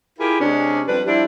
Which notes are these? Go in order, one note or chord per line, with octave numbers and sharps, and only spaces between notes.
E4 F4 G4 G#4 A#4
C3 G#3 C#4 D4
F2 G3 D4 B4
F3 G3 D4 E4